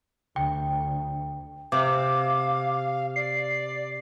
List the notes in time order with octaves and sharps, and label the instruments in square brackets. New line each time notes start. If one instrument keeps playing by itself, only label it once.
[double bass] D2 [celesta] G5
[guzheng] C3 [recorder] F5 [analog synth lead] D6
[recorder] D5 [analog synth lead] C7